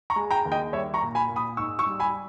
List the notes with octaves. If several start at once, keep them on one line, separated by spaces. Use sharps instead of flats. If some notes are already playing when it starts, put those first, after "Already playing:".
A#5 C#6
G#3
G5 A#5
D#2
D#5 G5
G3 C#5 E5
A#5 C#6
A#2
G#5 B5
A#2
B5 D#6
G#2 C#6 E6
C#6 E6
G3
G#5 B5